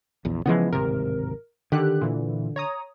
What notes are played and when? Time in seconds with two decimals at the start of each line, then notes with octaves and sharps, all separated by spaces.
0.25 A#1 E2
0.46 C#3 E3 F3 G#3 B3
0.73 D1 G#1 C3 A#4
1.72 D3 D#3 G4 F#6
2.01 A#2 E3
2.56 C#5 A#5 D#6